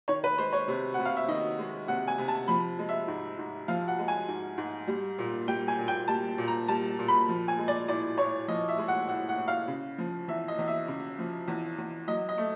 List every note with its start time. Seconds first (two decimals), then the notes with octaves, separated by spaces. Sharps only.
0.08 D#3 C#5
0.24 B4
0.38 G#3 C5
0.52 C#5
0.68 C3
0.94 C3 F#5
1.05 F5
1.17 E5
1.28 D#3 D#5
1.59 G#3
1.88 C3 F#5
2.08 G#5
2.18 C3
2.28 A5
2.48 F3 B5
2.79 G#3
2.89 E5
3.08 G#2
3.38 G#2
3.68 F3 F5
3.88 F#5
3.99 G#3
4.08 G#5
4.28 G#2
4.58 G#2
4.88 G3
5.18 A#2
5.48 G3 G5
5.68 G#5
5.78 A#2
5.88 G5
6.08 G3 A5
6.38 A#2
6.48 A#5
6.68 G3 A5
6.99 A#2
7.08 B5
7.29 F3
7.48 G#5
7.58 G#3
7.68 D5
7.88 A2 D5
8.18 A2 C#5
8.48 F3 D#5
8.68 E5
8.78 G#3
8.88 F#5
9.09 A2 F#5
9.29 F#5
9.38 A2
9.48 F5
9.68 C#3
9.98 F3
10.28 E2 E5
10.48 D#5
10.59 E2
10.68 E5
10.88 C#3
11.19 F3
11.48 E2
11.78 E2
12.08 F#3 D#5
12.29 D#5
12.38 A3